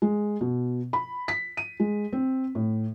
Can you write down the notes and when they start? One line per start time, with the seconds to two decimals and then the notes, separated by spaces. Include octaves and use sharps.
0.02 G#3
0.41 B2
0.93 B5
1.28 B6
1.57 D#7
1.80 G#3
2.13 C4
2.55 A2